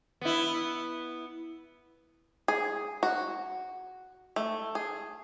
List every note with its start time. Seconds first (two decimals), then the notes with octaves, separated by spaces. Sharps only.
0.21 B3 E4
2.48 G#4
3.03 F#4
4.36 A3
4.75 G#4